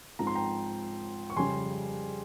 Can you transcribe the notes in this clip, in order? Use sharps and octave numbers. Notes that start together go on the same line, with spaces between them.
G#2 F3 C4 A#5
C6
G5 A#5
C#6
F2 C#3 G3 G#5 C6